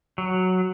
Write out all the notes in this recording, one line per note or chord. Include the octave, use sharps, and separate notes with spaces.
F#3